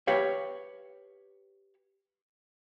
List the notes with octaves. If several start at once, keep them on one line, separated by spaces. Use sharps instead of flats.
G4 B4 C#5 F5